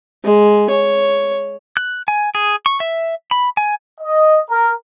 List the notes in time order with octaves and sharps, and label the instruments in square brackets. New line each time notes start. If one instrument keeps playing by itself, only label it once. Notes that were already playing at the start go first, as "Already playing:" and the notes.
[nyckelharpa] G#3
C#5
[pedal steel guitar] F#6
G#5
G#4
C#6
E5
B5
G#5
[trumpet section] D#5
A#4